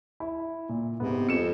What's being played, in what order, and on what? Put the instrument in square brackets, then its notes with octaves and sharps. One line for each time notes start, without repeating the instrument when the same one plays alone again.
[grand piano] E4
A#2
[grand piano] G#2 B3 [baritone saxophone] C3
[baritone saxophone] F2 [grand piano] C#7 E7